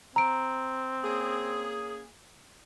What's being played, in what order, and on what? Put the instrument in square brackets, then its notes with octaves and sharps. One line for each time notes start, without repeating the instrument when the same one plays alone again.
[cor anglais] C4 [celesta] A#5 D7
[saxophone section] A#3 C#4 G#4